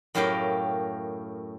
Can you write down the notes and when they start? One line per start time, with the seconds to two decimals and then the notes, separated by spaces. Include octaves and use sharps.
0.15 F#2 A2 G4 A#4 F5 G5